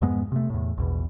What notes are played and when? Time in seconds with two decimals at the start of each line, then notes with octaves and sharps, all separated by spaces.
0.02 F2 G#2 G#3 B3
0.32 C3 A3
0.50 E2 A2
0.77 A#1 E2 B2